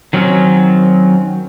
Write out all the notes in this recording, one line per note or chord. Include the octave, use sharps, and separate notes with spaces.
D#3 F#3 C4 C#4